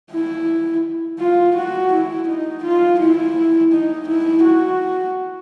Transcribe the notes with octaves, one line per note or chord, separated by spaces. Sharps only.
E4
F4
F#4
E4
D#4
F4
E4
D#4
E4
F#4